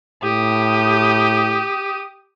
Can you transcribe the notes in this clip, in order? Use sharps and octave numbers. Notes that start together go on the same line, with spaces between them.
A2 G4 D#6